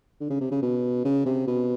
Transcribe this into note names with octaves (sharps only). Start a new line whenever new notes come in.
D3
C#3
C3
C#3
B2
C#3
C3
B2